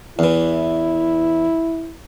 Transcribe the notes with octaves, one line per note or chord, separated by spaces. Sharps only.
E2 E3 E4